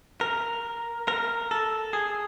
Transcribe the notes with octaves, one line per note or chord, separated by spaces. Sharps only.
A#4
A#4
A4
G#4